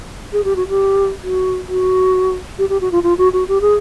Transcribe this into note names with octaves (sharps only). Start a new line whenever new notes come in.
G#4
G4
F#4
G4
F#4
F#4
G4
G4
F#4
F4
F4
F#4
F#4
G4
G#4